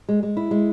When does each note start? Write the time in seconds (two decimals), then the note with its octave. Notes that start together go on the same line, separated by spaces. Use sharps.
0.09 G#3
0.23 G#3
0.37 E4
0.51 G#3